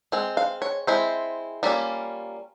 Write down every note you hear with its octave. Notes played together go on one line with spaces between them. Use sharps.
G#3 C4
F5
C#5
G#3 C4 E4 C5
G3 A#3 C#4 F4